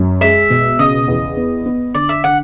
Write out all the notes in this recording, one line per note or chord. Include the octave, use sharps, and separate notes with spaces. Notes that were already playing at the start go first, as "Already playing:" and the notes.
Already playing: F#2
G#3 E5
B2
C#3 D#5
E2
B3
B3
D3 D5
E5
D3 F#5